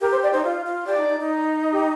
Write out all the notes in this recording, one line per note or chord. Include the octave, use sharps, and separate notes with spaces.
G4 A#4
C5
D5
D#4 C5
F4
F4
G4 D5
D#4
D#4
D#4
G4